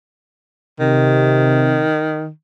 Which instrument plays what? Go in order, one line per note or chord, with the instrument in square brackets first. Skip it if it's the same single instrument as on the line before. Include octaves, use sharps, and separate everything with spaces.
[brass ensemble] C3 [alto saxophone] D#3